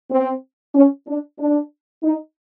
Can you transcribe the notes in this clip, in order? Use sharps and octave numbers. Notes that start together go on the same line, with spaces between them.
C4
C#4
D4
D4
D#4